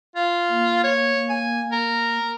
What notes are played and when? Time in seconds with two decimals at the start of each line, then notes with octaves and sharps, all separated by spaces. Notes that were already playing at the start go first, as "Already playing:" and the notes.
0.16 F4
0.49 A#3
0.84 C#5
1.30 G#5
1.72 A#4